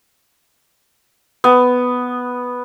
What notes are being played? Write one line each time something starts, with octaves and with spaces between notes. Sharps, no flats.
B3